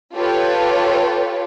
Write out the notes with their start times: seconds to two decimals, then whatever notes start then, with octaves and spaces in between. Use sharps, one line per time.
0.15 F4 G4 A4 B4 C#5